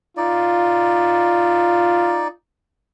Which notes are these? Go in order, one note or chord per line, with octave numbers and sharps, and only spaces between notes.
D#4 F4 D5